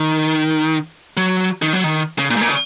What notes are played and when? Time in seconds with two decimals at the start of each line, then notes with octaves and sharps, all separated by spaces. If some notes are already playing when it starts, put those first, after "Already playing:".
Already playing: D#3
1.17 F#3
1.62 D#3
1.73 F#3
1.84 D#3
2.19 C#3
2.30 A#2
2.36 G#2
2.41 A#2
2.49 C#3